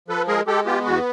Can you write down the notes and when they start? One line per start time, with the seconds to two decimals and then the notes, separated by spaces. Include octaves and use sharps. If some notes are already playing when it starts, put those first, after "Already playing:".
0.08 F3 A4 B4
0.27 G#3 G#4 A#4
0.47 G#3 G4 A4
0.66 B3 F4 G4
0.85 E2 F#4